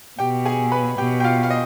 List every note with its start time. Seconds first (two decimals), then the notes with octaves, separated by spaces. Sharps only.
0.19 B2 G4 G5
0.45 G#4 G#5
0.72 B4 B5
0.98 B2 G4 G5
1.20 G5
1.24 F4 F5
1.43 F5
1.50 D#5